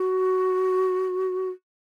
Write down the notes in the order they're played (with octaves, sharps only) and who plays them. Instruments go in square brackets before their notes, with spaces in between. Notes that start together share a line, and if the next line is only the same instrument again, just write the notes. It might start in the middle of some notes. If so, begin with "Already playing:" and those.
Already playing: [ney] F#4